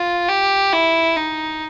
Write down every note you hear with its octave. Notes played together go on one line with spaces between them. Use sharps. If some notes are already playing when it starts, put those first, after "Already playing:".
Already playing: F4
G4
E4
D#4